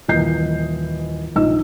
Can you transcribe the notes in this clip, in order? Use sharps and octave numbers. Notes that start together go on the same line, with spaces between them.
D#1 E3 A#3 D#5 G6 C7
A#1 D#4 D#5 E6